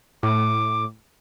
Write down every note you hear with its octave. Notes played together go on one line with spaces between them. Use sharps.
A2 D6